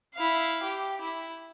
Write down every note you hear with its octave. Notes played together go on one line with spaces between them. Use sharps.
E4 F5
G4
E4